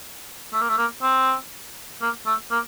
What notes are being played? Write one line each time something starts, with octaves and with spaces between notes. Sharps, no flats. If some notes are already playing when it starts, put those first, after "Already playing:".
A3
A#3
A3
A#3
C4
A#3
A3
A#3